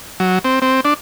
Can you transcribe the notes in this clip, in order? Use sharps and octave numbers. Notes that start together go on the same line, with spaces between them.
F#3
C4
C4
D4